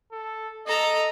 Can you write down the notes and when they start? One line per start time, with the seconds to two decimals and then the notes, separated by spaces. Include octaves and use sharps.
0.12 A4
0.67 A4 D#5 A#5